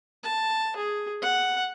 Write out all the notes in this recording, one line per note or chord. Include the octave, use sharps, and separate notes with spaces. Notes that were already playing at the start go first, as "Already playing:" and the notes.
A5
G#4
F#5